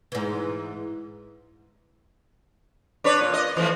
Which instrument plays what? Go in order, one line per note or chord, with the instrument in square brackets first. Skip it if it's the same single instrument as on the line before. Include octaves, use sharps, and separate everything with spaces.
[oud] G#2 E3
[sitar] D4 B4 C#5
A#2
D#5
E3 F3 A3